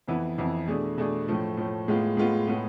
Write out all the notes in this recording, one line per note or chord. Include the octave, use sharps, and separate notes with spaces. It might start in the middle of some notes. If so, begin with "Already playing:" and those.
F2 E3 B3 E4
F2 E3 B3 E4
B2 A3 D4 G#4
B2 A3 D4 G#4
A2 F3 A3
A2 F3 A3
A2 G#3 B3 F4
A2 G#3 B3 F4
A2 G#3 B3